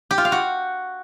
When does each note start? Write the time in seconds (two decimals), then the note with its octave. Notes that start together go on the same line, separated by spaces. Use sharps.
0.11 G4
0.18 F4
0.25 F5
0.32 F#4